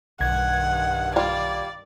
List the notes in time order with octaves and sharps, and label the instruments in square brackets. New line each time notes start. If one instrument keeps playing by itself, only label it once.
[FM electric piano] B1 G#6 [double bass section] G2 D#3 [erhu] F#5
[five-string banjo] G3 F4 [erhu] D5